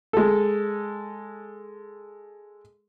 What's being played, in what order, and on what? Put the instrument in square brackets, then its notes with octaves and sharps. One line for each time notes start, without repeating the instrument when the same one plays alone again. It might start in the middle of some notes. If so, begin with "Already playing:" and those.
[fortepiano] G#3 A4